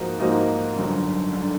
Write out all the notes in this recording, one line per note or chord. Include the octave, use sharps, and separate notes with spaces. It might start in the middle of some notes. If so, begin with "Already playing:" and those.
Already playing: G#2 F3 A#3 D#4 F#4
G#2 F3 A#3 D#4 F#4
G1 F#2 D3
D3